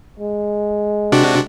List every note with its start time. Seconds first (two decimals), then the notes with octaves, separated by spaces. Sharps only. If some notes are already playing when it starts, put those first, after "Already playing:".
0.19 G#3
1.12 C3 D4 F#4